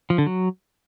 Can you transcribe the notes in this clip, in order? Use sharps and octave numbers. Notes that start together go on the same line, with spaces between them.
F3
D3
F#3